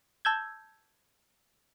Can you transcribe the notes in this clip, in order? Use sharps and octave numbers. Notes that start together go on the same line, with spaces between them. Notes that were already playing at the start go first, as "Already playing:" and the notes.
A5 E6 G6 G#6